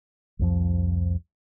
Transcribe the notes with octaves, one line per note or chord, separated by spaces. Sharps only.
C2 F2 F3